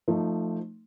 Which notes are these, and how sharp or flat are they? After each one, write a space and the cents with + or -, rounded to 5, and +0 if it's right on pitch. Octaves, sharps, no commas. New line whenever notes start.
F3 +0 A3 +10 D#4 -10